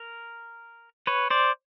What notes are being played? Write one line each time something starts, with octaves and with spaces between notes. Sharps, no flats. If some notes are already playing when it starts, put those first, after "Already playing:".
Already playing: A#4
B4 C#5
C5 D5